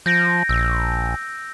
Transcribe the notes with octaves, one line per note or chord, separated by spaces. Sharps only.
F3 G6 A#6 D7
A#1 E6